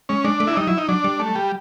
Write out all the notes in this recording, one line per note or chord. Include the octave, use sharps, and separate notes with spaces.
G#3 C#4
G#3 D4
A3
E4
G3 D#4
F#3 E4
D#4
F#3 D4
G3
A3
G3